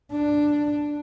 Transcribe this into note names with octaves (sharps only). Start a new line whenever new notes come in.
D4